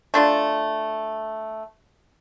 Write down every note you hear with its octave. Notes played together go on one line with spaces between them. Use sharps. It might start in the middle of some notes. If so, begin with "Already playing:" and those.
A3 D4 F4